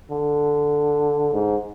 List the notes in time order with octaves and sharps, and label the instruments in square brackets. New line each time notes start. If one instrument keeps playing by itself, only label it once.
[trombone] D3
G#2